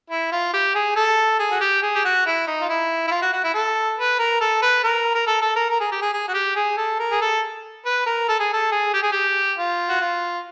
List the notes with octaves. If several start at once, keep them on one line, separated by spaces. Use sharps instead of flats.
E4
F4
G4
G#4
A4
G#4
F#4
G4
G#4
G4
F#4
E4
D#4
F4
E4
E4
F4
F#4
F#4
E4
A4
B4
A#4
A4
B4
A#4
A#4
A4
A4
A#4
A#4
G#4
G4
G#4
G#4
F#4
G4
G#4
A4
A#4
G#4
A4
B4
A#4
A4
G#4
A4
G#4
G4
G#4
G4
F4
F#4
F4